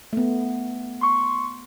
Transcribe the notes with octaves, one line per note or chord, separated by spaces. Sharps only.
A3 B3
C6 C#6